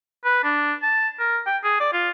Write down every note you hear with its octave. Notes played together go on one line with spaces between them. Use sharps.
B4
D4
A5
A#4
G5
G#4
D5
F4